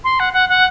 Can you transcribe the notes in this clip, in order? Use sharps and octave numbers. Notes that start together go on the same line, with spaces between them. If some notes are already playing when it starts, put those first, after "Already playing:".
C6
F#5
F#5
F#5